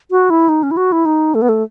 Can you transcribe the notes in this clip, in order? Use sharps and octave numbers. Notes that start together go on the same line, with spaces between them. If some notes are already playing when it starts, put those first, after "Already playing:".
F#4
E4
D#4
C#4
E4
F#4
E4
D#4
A3
B3
A3